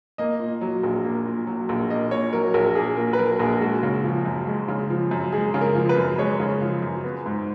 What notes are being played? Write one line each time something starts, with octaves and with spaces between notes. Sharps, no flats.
A#3 D#5
A#2
F#3
A#1
A#3
A#2
F#3
A#1
A#3 D#5
A#2 C#5
F#3 A#4
A#1 A#4
A#3 G#4
A#2 A#4
B4
F#3 A#4
A#1 G#4
G#3 F#4
C#3
F3
F#2
G#3
C#3
F3
F#2
G#3 G#4
C#3
A#4
F3
B4
F#2
G#3 C#5
C#3
F3
F#2
B3
G#2